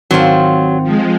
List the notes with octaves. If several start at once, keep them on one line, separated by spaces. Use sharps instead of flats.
G#1 D#3 F#3 C4 F4 C5
F3 G#3